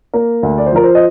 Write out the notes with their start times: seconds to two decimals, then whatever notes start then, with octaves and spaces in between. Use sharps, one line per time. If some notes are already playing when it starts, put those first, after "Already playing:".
0.14 A#3 A#4
0.43 D2
0.58 D5
0.66 C5
0.72 F3 A#4
0.84 C5
0.95 D#5